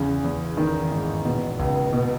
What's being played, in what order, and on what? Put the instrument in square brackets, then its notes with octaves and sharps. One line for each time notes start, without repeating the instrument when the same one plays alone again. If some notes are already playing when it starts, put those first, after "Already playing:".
Already playing: [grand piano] E2 C#3
E2
D#3
G#2
B2
C#2
B2